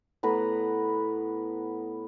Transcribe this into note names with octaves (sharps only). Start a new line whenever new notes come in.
A2 B3 B4 A#5